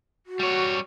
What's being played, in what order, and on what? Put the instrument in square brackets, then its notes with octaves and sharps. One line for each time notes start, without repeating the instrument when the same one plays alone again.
[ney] F#4
[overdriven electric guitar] G3 C#5